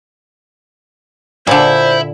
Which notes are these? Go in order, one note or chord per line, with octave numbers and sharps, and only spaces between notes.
A#2 D3 E4 C5